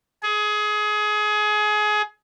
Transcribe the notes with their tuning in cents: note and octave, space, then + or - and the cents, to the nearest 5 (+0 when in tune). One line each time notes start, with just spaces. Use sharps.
G#4 +25